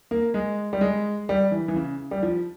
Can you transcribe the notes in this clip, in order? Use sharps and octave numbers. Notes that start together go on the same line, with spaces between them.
A#3
G#3
G3
G#3
G3
E3
E3
C#3
G3
F3